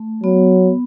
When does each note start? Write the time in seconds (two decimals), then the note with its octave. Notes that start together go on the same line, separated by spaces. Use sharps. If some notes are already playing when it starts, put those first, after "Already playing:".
Already playing: A3
0.24 F#3 B3